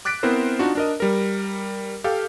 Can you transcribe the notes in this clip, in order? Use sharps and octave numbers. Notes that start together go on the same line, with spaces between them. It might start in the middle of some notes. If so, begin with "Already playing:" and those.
D6 F#6 A6 B6 D7
B3 C4 E4 A#4 C5
D4 D#4 F4 F#4
D4 A#4 D#5
G3 A#4
G4 A4 F5